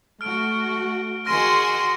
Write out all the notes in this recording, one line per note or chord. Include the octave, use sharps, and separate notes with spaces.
A3 F#4 F6 D7
D#3 F#4 G#4 C6 F6 A#6 D#7